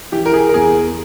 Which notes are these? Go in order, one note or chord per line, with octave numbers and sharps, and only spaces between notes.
E3 G4
A#4
G#4
A#4
E2 G#4